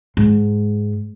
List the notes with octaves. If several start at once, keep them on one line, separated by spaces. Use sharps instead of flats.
G#2